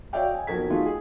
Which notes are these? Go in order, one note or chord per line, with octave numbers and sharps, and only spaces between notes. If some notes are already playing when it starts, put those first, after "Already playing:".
F#4 C#5 D5 E5 F5 G5
D#5 G#5
B1 F2 F#4 A#4 G#6 B6
D#3 A3 D#4 F4 F#4 G#4
G#4